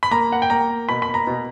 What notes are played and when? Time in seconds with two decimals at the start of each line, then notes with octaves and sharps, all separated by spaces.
0.03 B5
0.11 A#3 A#5
0.32 F#5
0.42 G5
0.50 A#3 A#5
0.89 B2 B5
1.02 B5
1.14 A#5
1.27 B2